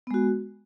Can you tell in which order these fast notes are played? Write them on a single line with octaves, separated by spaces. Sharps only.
B3 G#3 F#4